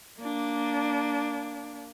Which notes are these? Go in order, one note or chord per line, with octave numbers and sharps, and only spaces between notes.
A#3 D4